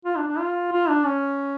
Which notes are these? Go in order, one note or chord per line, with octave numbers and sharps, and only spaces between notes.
F4
D4
D4
F4
F4
D4
C#4